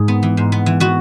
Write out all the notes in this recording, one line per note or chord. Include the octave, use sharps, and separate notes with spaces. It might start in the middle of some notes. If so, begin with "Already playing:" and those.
Already playing: G#2 G#4
B3
E3
G#2
B3
E3
B3 F#4